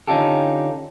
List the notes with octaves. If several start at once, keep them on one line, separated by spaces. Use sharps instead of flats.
D3 C#4 D#4 F4 G4 A4